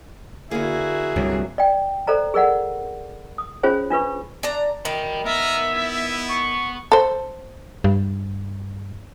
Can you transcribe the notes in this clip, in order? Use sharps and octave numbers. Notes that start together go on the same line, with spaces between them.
D3 A#3 E4 F#4 G#4
C2 G2 F#3
D5 G5
A4 C5 D5 A#5
G#4 A#4 D5 F#5
D#6
C#4 F4 G#4 C5 C#5
D4 F4 B4 C#6
D4 A#5
D#3 G5 B5
B3 A#4 E5
E4
C#6
A4 C5
G2